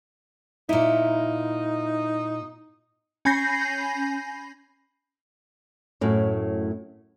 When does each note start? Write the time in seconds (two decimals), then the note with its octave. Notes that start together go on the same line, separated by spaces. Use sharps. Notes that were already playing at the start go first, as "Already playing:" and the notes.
0.69 A#2 D#4 E4
3.25 C#4 G#5 B5 G6 A#6 C7
6.01 F#2 A2